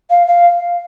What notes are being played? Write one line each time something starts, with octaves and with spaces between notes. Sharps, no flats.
F5
F5